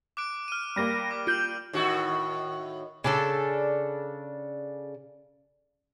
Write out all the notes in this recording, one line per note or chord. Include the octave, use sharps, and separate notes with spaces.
D6 F#6 D7
F6 D#7
G3 A#3 B5 A#6
D6
F4 G6 D7 F#7
A2 D#3 F#4
C#3 D4 A4